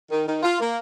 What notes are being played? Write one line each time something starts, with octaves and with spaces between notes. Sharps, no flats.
D#3
D#3
F4
A#3